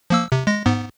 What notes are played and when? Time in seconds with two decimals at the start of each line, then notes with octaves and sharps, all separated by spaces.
0.10 F3 A#3 E6
0.32 C3
0.47 G#3 A#6
0.66 G#2 B3